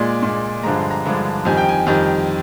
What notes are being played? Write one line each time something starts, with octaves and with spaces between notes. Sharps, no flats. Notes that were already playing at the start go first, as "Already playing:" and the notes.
Already playing: A#2 G#3 D5
A#2 G#3
G2 D3 F3 G#3 A#5
C6
A#5
G2 D3 F3 G#3
F2 D#3 G3 G#5
G5
G#5
F2 D#3 G3